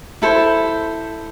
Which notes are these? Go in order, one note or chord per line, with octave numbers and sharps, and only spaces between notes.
E4 A4 C5